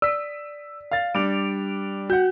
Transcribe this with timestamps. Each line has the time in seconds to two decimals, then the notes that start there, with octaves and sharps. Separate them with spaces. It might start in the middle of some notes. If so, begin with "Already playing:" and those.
0.02 D5 E6 B6
0.91 F5 A6
1.15 G3 D4 D7 F7
2.10 F#4 F#5 G6